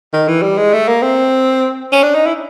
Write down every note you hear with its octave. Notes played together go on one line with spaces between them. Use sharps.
D#3
E3
G3
G#3
A3
A#3
C4
C#4
D4
D#4
E4